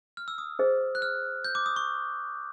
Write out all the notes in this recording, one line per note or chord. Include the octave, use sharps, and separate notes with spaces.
F6
E6
D#6
G#4 C5 D#5
F#6
F6
G6
D6
D#6
C#6